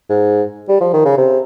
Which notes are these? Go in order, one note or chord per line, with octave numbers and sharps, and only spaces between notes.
G#2
G3
F3
D#3
C#3
C3